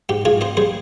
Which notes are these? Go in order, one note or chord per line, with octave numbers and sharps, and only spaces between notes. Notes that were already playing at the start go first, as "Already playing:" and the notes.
G#2 G4
G#2 F4 G#4
C4 C5 D#5
G3 G#4 C5